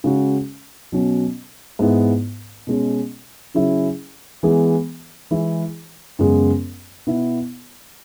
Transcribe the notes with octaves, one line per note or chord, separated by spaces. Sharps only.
C#3 G#3 C#4 F#4
B2 F#3 C#4 F#4
G#2 G#3 B3 E4
B2 G#3 C#4
C#3 F#3 C#4 E4 G#4
E3 G#3 B3 G#4
E3 G#3 E4 G#4
F#2 C#3 G#3 B3
B2 B3 E4